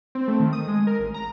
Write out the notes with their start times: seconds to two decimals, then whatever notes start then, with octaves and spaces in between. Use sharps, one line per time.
0.15 C4
0.28 A3
0.40 D#3
0.53 D#6
0.68 G#3
0.87 A#4
0.99 A1
1.14 A#5